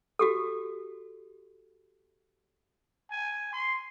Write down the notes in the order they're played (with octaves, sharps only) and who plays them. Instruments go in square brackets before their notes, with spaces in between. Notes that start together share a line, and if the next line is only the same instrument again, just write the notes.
[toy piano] F#4 G4 A4
[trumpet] G#5
C6